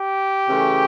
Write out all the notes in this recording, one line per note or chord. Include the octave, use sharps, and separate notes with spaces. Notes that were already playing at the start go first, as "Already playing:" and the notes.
Already playing: G4
C#3 E3 A3